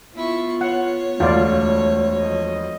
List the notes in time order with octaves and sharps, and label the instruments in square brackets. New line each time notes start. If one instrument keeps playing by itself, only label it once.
[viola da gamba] B3 F4 [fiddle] E4 C#6
[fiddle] C#5 [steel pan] F#5
[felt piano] E1 D2 [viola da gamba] A3 [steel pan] F4 D5
[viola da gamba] F3 D#5